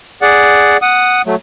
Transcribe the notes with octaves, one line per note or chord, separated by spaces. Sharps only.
G#4 D5 F#5
F#5 D#6
F#3 A3